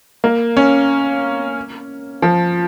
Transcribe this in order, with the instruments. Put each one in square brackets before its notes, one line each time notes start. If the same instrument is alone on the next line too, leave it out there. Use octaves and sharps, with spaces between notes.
[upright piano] A#3
C#4
F3